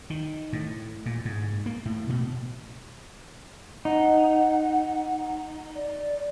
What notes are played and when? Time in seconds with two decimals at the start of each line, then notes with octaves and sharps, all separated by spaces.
0.10 D#3
0.53 A2
1.06 A#2
1.25 G#2
1.66 A#3
1.85 A2
2.09 B2
3.85 D#4 F#5
5.76 D5